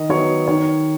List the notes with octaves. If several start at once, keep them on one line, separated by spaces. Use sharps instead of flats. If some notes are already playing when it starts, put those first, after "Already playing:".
Already playing: D#3 D#5
F#3 B3 C#5
D#3 C#5